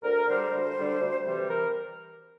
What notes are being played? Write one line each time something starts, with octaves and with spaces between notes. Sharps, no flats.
D2 A#4
D3 G3 C5
D2
D3 G3
D2
C3 E3 G3
A#4